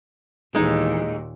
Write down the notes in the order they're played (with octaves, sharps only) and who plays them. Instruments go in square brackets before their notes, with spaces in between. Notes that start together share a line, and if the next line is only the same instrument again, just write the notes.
[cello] D#2 A#2 [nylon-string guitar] E3 B3 A4 [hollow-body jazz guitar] G#3 D#4